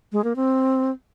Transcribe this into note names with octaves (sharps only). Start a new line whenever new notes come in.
G#3
A#3
C4